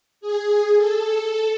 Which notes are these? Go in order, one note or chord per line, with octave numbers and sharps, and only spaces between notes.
G#4
A4